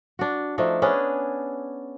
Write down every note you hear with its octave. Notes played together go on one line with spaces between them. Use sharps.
D4 F#4
F3 A3 D4 D#4
B3 C#4 D4 G#4